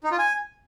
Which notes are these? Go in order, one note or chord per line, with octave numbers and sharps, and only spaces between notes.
D#4
F4
G#5